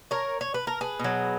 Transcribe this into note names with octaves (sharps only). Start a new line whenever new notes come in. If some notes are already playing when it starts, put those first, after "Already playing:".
A#4 C#5
C#5
B4
A#4
G#4 B4
B2 F#3